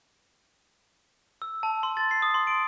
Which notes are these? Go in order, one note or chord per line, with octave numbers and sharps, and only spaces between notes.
E6
A5
C6
A6
C7
D#6
C6
D7